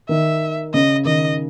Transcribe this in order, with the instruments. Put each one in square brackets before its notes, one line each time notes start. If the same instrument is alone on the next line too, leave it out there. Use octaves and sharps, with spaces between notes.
[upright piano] D#3 [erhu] E5
[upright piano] C#3 [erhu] D#5
[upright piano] D#3 [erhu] D#5